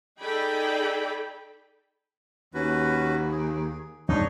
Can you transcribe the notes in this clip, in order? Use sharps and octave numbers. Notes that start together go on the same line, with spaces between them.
D#4 G#4 A4 D5 G5 B5
D#2 C#4 F#4 B4
G#4
E2 G2 G#3 D4 D#4 C#5